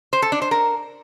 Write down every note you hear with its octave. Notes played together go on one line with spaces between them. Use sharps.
C5
A4
D4
C5
A#4